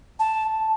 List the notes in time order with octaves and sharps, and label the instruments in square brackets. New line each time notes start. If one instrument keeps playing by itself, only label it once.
[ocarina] A5